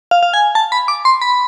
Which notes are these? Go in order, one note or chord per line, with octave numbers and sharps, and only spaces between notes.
F5
F5
G#5
A5
B5
D6
C6
B5